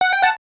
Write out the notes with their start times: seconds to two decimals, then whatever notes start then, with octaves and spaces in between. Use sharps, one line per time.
0.01 F#5
0.13 G5
0.23 F#5 A5